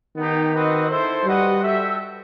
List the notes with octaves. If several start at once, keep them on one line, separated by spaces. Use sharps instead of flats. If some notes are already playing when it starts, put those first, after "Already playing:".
D#3 B3 D#4 G4
C4 F#4 B4 D#5
E4 A4 C5
G3 F#4 B4 D#5 F#5
F#4 A4 E5 G5